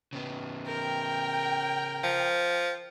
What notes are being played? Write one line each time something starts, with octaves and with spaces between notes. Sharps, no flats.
C#3 B3
A#4 G5
F3